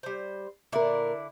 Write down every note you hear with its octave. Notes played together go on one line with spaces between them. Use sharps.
G3 C5
A#2 D3 E4 A#4 D5